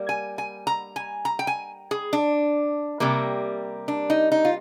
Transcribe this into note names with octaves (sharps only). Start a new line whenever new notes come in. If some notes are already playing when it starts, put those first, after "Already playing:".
Already playing: G3 A#3
G#5
G#5
A#5
G#5
A#5
G5
G#5
G#4
D4
C3 G3 A#3
D4
D#4
D#4
F4